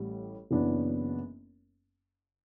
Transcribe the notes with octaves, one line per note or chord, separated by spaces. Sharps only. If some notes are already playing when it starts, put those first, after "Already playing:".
Already playing: A1 A2 G3
F#1 F#2 E3 B3 D4